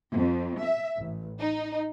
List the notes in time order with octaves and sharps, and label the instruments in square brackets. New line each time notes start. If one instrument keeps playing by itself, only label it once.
[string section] F2
E5
A1
D#4